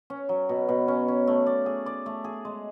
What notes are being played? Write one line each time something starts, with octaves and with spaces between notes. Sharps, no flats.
C#4
F#3
B2
B2
C#4
C#4
A3
D5
G#4
D5
A3
G#4
G#3